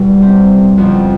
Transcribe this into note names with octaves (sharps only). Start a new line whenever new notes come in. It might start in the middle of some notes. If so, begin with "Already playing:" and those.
Already playing: E2 B2 G3
C4
F2 C#3 F3 B3